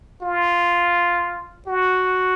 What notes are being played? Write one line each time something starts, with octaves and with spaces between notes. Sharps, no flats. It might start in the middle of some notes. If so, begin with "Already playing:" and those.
F4
F#4